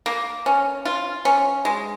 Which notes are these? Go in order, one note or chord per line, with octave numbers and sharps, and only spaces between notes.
A#3
C#4
F4
C#4
G#3